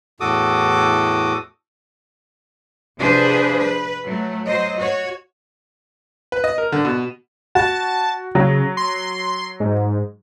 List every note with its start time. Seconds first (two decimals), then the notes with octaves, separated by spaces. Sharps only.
0.20 E2 A2 F#4 A4 D6 D#6
2.99 C3 F3 D4 G#4 B4 C5
3.60 B4
4.05 F#3 A3
4.45 F#3 C5 D#5
4.77 F#4 C#5
6.32 B4
6.44 D#5
6.58 A#4
6.72 D3
6.85 B2
7.55 F#4 A5
8.35 C#3 F#3
8.77 C6
9.60 G#2